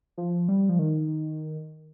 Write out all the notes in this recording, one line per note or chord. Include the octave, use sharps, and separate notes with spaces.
F3
G3
F3
D#3